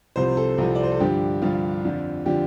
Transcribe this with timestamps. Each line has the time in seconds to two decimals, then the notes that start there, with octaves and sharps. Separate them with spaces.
0.16 C2 C3 F3 C5
0.37 A4
0.58 C2 C3 F3
0.75 D5
0.83 C5
0.92 A4
1.00 G2 D3 F3 G4
1.42 G2 D3 F3 F4
1.84 F2 D3 F3
2.26 D3 F3 G4